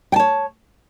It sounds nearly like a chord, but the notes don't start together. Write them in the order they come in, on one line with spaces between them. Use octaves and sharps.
G5 A5 C#5